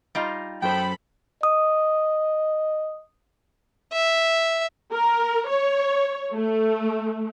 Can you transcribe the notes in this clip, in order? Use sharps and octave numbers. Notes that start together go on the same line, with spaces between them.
G3 D#4 F4
F#2 A4 C5 G5 B5
D#5 D#6
E5
A#4
C#5
A3